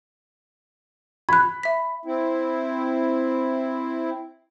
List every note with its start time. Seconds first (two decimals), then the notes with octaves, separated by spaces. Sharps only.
1.29 B5 F#6 G#6
1.63 E5 B6
2.05 C4 E4